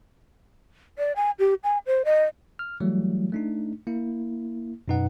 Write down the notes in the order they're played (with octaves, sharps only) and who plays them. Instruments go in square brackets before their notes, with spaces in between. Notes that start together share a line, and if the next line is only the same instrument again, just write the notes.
[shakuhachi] D5
G#5
G4
G#5
C5
D#5
[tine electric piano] F6
E3 F#3 G3 A3 E4
A3 D4 D#4
A#3 E4
F#2 B2 D#4 B4 F#5